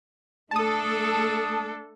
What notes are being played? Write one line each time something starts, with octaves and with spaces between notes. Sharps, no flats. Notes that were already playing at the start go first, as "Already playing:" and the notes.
A3 D4 A4 A5 D#6